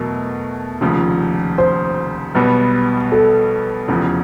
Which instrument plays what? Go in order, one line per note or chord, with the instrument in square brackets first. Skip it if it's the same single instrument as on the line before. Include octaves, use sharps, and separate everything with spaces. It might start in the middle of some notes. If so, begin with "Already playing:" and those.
Already playing: [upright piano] E2 B2 F#3 A3 [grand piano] A#4
[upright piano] F1 D#2 C#3 F3
[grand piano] C5
[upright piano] B1 B2 G3 B3
[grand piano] A4
[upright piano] F1 E2 C#3 F3